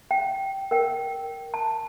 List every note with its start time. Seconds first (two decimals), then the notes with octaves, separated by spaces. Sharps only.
0.11 G5
0.71 A#4 G5
1.54 A5